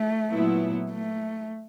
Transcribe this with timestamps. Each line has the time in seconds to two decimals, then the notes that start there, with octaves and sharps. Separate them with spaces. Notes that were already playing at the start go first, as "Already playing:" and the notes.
Already playing: A3
0.30 A#2 F#3 B3 E4
0.91 A3